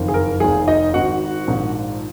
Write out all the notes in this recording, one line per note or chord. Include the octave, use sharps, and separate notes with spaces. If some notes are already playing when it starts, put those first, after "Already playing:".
Already playing: F#1 F2 D#3
G#4
A#4
F1 D#2 D#3 G#4
D#4 D#5
G#1 G#2 D#3 F#4 F#5
A#1 G#2 D#3